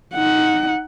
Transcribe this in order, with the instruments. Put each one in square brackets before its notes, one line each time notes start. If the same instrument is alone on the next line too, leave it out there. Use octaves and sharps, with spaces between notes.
[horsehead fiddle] D#4 F#5